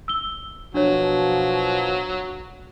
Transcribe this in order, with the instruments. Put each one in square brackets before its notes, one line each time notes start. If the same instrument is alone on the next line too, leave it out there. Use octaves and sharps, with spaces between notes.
[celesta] E6 G7
[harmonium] B2 F3 [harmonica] F#3 [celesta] D4 C#5